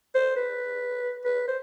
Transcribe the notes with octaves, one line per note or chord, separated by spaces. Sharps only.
C5
B4
B4
C5